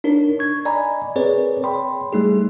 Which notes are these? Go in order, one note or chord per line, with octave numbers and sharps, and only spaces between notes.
D4 D#4 A#4 C#5
C#6 G#6
D5 D#5 G#5 A#5 B5
C4 G#4 A#4 B4 C#5 D5
C#5 G5 B5 C6
G3 A3 D#4 G#4